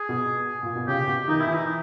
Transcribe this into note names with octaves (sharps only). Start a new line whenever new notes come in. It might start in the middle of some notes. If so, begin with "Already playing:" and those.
Already playing: G#4
B2
A#2
B2
C#3 G4
B2
D#3 D#4
E4
E3
D#4